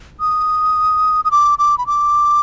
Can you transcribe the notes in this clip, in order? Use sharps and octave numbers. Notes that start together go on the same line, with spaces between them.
D#6
D#6
D6
D6
B5
D6